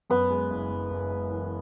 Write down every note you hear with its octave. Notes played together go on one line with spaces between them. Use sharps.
F#2 B3
G#3
F#1
F#1
F#1
G#3
E3